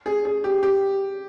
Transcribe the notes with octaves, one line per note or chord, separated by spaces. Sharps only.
G#4
G#4
G4
G4